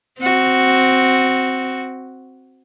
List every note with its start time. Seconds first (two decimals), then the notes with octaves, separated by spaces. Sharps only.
0.20 C4 F#4